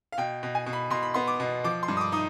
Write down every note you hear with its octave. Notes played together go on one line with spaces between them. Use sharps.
F5
B2 G5
B2
G#5
B2
B5
B2 C6
B5
B3 C6
D6
B2
F3 D6
C6
G2
D#6
D6
D#4 D#6